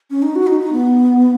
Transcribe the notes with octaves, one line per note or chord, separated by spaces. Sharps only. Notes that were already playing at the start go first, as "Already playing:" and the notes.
C#4
D#4
F#4
D#4
D#4
B3